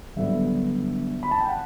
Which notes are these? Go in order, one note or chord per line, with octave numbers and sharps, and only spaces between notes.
G1 G2 D3 F#3 B3 E5
B5
A5
G5
F#5